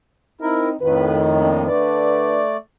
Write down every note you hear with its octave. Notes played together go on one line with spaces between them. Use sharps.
C4 D#4 E4 A#4
F2 A2 D#3 F4 B4
A#3 D4 D#4
D3 A3 D4 B4 D5